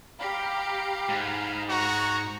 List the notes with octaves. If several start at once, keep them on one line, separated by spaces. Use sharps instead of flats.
G4 F5 A#5 B5
G#2
F#4 A#5 C#6